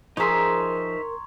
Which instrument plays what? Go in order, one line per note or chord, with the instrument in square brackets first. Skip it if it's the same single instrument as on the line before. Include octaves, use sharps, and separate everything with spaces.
[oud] F3 G#4 [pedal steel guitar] D#4 E5 [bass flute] A#4 [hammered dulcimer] C#5 A#5 C6